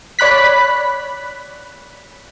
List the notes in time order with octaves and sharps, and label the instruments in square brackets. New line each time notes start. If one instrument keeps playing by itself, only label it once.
[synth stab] C#5 D5 B5 F#6 B6